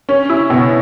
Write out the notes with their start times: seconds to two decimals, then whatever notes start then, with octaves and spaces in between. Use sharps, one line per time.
0.09 C#4
0.30 E4
0.50 B2